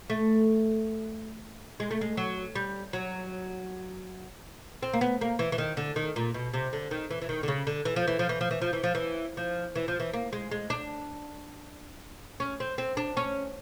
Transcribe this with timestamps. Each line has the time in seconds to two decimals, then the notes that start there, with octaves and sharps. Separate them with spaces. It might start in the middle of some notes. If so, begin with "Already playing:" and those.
0.10 A3
1.80 G#3
1.91 A3
2.01 G#3
2.17 F#3
2.55 G3
2.93 F#3
4.83 C4
4.93 A#3
5.01 B3
5.21 A#3
5.39 E3
5.52 E3
5.58 D#3
5.77 D3
5.96 D#3
6.16 A#2
6.34 B2
6.54 C3
6.73 D3
6.91 D#3
7.11 E3
7.22 E3
7.29 D#3
7.43 D3
7.48 C#3
7.67 D3
7.85 E3
7.96 F3
8.08 E3
8.19 F3
8.29 E3
8.41 F3
8.51 E3
8.62 F3
8.73 E3
8.84 F3
8.95 E3
9.37 F3
9.76 E3
9.88 F3
10.00 E3
10.13 A#3
10.33 G#3
10.51 G#3
10.70 D4
12.40 C#4
12.60 C4
12.78 C4
12.97 D4
13.17 C#4